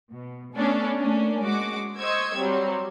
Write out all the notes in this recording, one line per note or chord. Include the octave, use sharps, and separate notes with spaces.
B2
A3 B3 C#4 D4 A4
A3 A#3 C#4 D4
G#3 F#4 D6
C5 D#5 C#6 E6 G#6
F#3 G3 C4